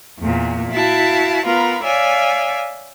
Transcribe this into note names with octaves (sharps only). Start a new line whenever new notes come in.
E2 A#2
E4 F#4 F5 A5
B3 F4 A#4 B4 A#5
C#5 D5 E5 F5 G#5